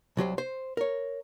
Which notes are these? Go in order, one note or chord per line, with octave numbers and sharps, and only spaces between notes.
C2 F#3 G4 C5
C5
A#4 C#5